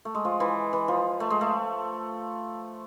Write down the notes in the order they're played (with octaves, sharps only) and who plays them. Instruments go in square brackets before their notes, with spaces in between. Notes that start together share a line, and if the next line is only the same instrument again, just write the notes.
[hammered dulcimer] A3
G#3
F3
E3
E3
F3
A3
G#3
A3